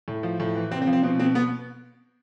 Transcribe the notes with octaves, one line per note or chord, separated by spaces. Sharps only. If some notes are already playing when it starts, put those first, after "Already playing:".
A2
F3
A2
E3
C3 C4
C4
F3
C4
B2 C4
B2 C4
B2 B3